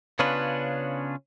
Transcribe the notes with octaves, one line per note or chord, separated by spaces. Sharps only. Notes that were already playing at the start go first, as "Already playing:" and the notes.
C#3 B3 C#4 D4 F4 B4